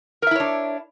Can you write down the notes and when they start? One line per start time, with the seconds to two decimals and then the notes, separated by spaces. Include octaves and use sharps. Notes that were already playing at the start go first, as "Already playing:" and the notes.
0.22 A#4
0.27 E5
0.31 E4
0.36 C#5
0.40 D4